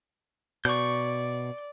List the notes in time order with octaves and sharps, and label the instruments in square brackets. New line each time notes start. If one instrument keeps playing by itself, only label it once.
[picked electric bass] B2 [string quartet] D5 [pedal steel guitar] C#6 G6